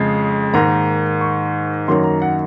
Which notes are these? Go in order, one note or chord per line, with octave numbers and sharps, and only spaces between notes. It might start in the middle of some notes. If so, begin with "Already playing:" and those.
Already playing: F2 C#3 G#3
G#2 D#3 A#3 A#5
C#6
F#2 D#3 F#3 A#3 C6
A#5
F#5